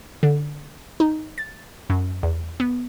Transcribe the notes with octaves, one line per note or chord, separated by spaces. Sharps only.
D3
D#4
A6
F#2
E2
B3